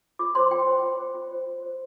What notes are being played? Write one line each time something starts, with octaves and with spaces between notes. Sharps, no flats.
F4 D6
C5 C6
F4 G5
C5
F4
C5
F4
C5
F4
C5